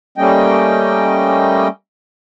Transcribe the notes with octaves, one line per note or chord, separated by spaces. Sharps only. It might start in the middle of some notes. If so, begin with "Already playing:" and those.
G3 A3 A#3 C#4 D#5 G5